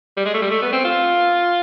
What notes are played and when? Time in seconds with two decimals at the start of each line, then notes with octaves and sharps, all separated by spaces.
0.17 G3
0.25 G#3
0.34 A3
0.42 G3
0.51 A3
0.62 B3
0.72 C4
0.85 F4